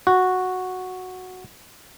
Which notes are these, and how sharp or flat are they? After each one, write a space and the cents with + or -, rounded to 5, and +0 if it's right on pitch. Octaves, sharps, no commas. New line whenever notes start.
F#4 -5